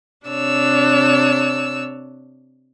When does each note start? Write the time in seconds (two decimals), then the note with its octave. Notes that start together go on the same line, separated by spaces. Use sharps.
0.26 C3 D4 C#5 E6